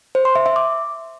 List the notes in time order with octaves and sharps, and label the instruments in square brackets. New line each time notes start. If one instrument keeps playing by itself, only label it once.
[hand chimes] C5
C6
E5
E5
D6